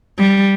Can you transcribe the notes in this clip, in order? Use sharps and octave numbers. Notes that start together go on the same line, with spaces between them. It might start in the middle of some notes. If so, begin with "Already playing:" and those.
G3